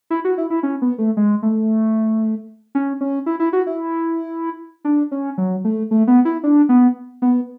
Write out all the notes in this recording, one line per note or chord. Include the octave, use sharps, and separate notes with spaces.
E4
F#4
E4
E4
C#4
B3
A3
G#3
A3
C#4
C#4
E4
E4
F#4
E4
D4
C#4
F#3
A3
A3
B3
E4
D4
B3
B3